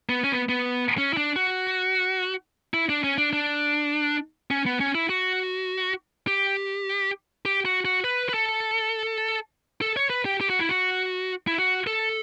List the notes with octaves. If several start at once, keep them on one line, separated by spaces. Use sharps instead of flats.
B3
C#4
B3
B3
C#4
E4
D4
F#4
E4
D4
C#4
D4
D4
C#4
B3
C#4
E4
F#4
G4
G4
F#4
F#4
B4
B4
A4
A4
C#5
B4
G4
G4
F#4
E4
F#4
E4
F#4
A4